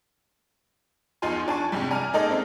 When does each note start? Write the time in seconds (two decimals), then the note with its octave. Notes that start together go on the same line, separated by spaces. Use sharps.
1.22 E2 F3 D#4 F4 G#5 C6
1.48 D4 G#5 A5 C#6
1.72 F2 G#2 C3 G3
1.91 D5 G#5 A#5 F6
2.13 G#3 A#3 D#4 A4 D5 D#5
2.29 A3 C4 C#4 D#4